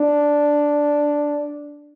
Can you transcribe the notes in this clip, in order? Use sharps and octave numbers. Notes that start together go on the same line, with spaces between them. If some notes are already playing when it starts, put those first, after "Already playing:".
Already playing: D4